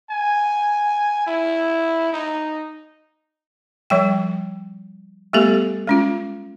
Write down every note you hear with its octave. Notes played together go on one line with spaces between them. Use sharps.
G#5
E4
D#4
F3 G3 G5
G3 A3 B3 G4 A4
G#3 C#4 F4